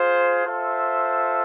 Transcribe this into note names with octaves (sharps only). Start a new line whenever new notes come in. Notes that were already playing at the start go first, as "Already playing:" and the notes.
Already playing: F4 G#4 C5
F4 A4 C5 E5